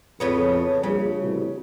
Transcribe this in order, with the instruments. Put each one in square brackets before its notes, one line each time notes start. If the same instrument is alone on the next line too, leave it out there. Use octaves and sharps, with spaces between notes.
[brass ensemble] F2 [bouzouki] A2 C#3 B3
[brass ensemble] A#1 G2 [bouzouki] C#3
[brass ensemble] A1 C3 F#4